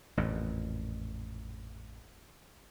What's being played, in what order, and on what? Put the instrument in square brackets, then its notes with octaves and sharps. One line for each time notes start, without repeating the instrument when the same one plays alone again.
[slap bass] A1 F2 A#2